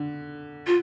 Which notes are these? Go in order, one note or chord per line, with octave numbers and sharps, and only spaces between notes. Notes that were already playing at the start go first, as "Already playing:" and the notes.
Already playing: D3
F4